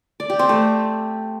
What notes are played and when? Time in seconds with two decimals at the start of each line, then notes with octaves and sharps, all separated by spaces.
0.20 D5
0.30 G4
0.39 C4
0.49 A3